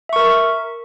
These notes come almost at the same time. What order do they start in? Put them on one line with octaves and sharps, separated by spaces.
E5 C#6 A#4